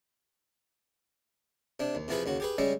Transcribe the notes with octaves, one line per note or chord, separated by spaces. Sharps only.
C3 D4
D#2
C3 E3 F3 F4 G#4 B4
D#2 C#3 F#4
G4 G#4 B4
C#3 G3 G#3 C#4 E5